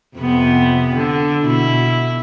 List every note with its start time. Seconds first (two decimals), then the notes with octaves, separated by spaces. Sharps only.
0.16 F2 C3 B3
0.95 D3
1.46 B2 E4